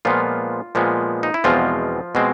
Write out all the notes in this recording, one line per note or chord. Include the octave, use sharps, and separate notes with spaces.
A#2 F3 G#3 B3 F4
A#2 F3 G#3 B3
D#4
E4
E2 B2 F3 G#3 C4 F4
B2 G#3 C4